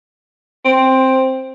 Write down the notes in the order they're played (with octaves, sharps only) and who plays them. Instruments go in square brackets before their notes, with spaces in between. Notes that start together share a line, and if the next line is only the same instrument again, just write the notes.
[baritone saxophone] C4